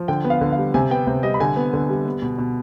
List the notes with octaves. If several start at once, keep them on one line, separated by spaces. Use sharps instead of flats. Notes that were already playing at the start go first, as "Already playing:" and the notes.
Already playing: F3
D3 G5
B3
F5
D3
F5
G3
C3 G#5
B3 G5
C3
G3 D#5
B5
D3 G#5
B3
D3
G3
B3
B2
B2